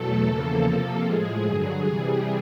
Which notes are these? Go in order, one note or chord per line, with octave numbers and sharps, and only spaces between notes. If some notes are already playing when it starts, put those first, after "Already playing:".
Already playing: E2 B2 F#3 A3 A4
E2 C#3 F3 A#3
C3 F3 A#3 A4
A2 F3 G#3 G#4
G2 D3 F#3
C3 E3 G3